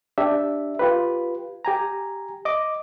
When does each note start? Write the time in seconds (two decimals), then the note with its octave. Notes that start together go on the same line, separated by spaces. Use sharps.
0.18 D4 G4 E5
0.79 F4 G4 B4
1.65 G4 G#5 A#5
2.45 D#5 D6